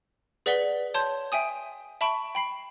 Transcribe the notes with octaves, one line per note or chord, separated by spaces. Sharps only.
G#4 B4 D5 F#5 B6 G7
C#5 A5 C6 G6
E5 G5 G#5 D#6
E5 A5 B5 C#6 D7
G5 B5 C7